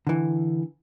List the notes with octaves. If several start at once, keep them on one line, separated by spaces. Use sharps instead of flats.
D3 E3